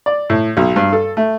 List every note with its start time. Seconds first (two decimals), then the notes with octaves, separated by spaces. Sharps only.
0.06 D5
0.30 A2
0.57 B1
0.76 G2
0.93 A4
1.17 A3